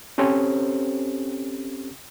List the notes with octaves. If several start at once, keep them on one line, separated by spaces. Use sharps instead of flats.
C4 C#4 G4 A4 C5 C#5